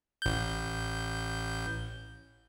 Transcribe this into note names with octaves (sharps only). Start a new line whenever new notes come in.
A1 G6